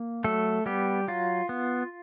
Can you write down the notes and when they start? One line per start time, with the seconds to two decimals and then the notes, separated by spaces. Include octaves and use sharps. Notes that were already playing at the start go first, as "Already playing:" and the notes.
Already playing: A#3
0.24 F#3 A3 A4
0.66 G3 B3 G4
1.08 F#3 F4
1.49 B3